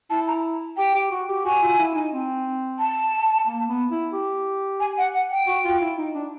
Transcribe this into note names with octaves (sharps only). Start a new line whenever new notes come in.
E4 A5
A#5
G4 G5
G4
F#4
G4
F#4 G#5
F4
E4
D#4
C4
A5
A#3
B3
E4
G4
G#5
F#5
F#5
G5
F#4
F4
E4
D#4
D4